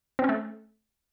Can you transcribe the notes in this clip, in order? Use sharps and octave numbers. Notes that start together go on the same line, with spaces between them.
C4
C#4
A3